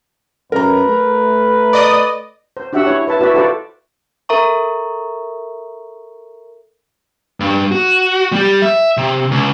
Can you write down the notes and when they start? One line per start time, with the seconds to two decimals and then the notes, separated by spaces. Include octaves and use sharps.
0.52 F#2 A#4 B4 A#5
0.85 A3
1.73 D5 D#5 D#6
2.57 C5
2.73 D4 F#4 G4 E5 F#5 E6
2.85 E4 C#5 F#5
3.07 B4 E5 A5
3.20 E4 F#4 B4 D5 E5
3.34 F4 F#4 A4 B4 C5 D5
4.29 A4 A#4 E5 A#5 C#6
7.40 G2
7.72 F#4
8.32 G3 G4
8.62 E5
8.97 C3
9.31 C#2